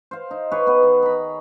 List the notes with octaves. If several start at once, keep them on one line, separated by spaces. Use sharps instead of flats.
C5 F5
D#4
G#4 B4 C#5
B3 B4
D#3
A#5 B5